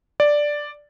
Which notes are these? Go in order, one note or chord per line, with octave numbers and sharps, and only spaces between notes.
D5